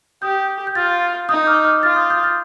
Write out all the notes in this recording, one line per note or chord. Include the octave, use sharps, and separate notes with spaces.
G4 D#6 G6
G6
F4 F6 A6
D#4 D#6 G6
D6 F6
D6 F6
F4 F6 A6
D#6 G6
D#6 G6
F6 A6